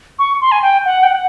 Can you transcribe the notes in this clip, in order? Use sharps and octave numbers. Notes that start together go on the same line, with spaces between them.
C#6
C6
G#5
G5
F#5
G5
F#5